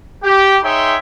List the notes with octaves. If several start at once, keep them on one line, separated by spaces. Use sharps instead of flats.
G4
D#4 G#4 C#5 E5 G5 C6